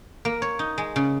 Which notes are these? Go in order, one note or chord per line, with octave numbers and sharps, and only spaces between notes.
A#3
C#5
D#4
G#3
C#3